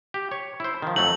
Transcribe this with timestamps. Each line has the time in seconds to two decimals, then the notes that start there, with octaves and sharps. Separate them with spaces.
0.14 G4
0.31 C#5
0.60 E4 C5
0.82 D#3 F3
0.96 F2 F#3 A3 F#7